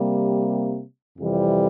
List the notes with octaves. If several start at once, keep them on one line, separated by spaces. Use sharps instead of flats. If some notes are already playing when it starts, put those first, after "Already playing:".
Already playing: C3 G3 A#3
F2 C3 E3 G3